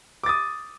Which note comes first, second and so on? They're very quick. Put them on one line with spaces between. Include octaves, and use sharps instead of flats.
D6 A6 D#6